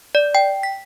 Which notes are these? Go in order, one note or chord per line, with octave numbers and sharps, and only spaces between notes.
D5
G5
B6